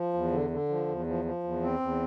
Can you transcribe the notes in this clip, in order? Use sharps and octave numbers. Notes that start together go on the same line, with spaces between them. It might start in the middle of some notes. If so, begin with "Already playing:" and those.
Already playing: F3
E2
D3
D3
F3
E2
F3
F3
E2
C4
E2